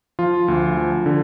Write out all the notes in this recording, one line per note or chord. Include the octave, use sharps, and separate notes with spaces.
F3 F4
D2
F3
D3